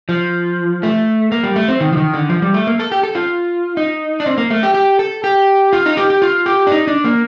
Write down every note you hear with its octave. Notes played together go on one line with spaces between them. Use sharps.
F3
A3
A#3
G3
A3
C4
D#3
F3
D#3
D3
F3
G3
A3
A#3
A4
G4
A4
F4
D#4
D4
C4
A#3
A3
G4
G4
A4
G4
F4
D#4
G4
G4
F4
G4
D4
D#4
D4
A#3